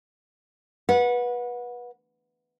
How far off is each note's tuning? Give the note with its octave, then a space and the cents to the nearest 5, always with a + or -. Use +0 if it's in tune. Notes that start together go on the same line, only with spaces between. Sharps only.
B4 -20 F#5 -25